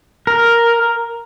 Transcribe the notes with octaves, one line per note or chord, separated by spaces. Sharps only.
A#4